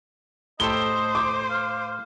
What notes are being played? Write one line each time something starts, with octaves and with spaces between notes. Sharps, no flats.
A2 G4 A4 C5 D#5 G7
D6
F5